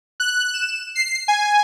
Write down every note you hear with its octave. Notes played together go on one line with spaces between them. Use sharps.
F#6
E7
C7
G#5